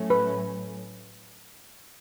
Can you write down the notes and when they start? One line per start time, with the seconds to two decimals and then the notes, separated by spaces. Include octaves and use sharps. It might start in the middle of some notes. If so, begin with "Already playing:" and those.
Already playing: A2 F#3 A3 C#4
0.10 B4